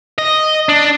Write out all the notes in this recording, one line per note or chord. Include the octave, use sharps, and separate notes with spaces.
D#5
D4